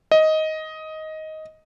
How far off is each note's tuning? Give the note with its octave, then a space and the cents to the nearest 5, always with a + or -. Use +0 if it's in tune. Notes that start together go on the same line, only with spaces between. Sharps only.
D#5 +10